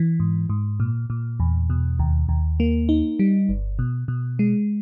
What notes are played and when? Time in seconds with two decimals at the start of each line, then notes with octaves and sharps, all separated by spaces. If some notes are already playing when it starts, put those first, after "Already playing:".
Already playing: E3
0.20 G#2
0.49 G#2
0.80 A#2
1.10 A#2
1.40 E2
1.70 B2
1.99 D#2
2.29 D#2
2.60 A#3
2.89 D#4
3.19 G3
3.49 G1
3.79 B2
4.08 B2
4.39 G#3